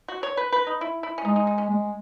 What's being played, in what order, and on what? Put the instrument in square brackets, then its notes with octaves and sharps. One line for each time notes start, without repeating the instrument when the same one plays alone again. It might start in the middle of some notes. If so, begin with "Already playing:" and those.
[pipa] F#4
C#5
B4
B4
D#4
E4
E4
C#4
[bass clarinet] G#3 [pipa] D#4
[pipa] D#4
D#4
C#4
[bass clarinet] G#3